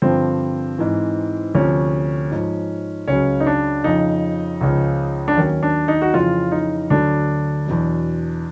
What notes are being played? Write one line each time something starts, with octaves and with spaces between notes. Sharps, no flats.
G2 D3 F3 C4
G#2 E3
D2 C3 F3 C#4
G#2 F3
C#2 C#3 F#3 C#4
D#4
D4
F2 C#3 F3 D#4
C#2 C#3 F3
D4
D#2 D#3 F#3 C#4
D4
D#4
F#4
F2 C#3 E3 F4
D#4
D2 D3 F#3 D4
E2 B2 F#3